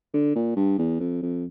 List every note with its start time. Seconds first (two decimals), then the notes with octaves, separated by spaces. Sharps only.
0.14 D3
0.35 A#2
0.56 G2
0.78 E2
1.00 F2
1.22 F2